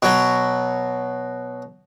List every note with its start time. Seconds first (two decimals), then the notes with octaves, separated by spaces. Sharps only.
0.02 B2 F#3